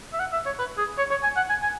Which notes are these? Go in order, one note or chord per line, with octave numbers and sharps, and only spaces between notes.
E5
F#5
E5
C#5
B4
G#4
C#5
C#5
G#5
F#5
G#5
G#5